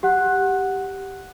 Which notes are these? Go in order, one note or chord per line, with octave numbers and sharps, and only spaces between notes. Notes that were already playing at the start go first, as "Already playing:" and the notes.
G4 F#5 F#6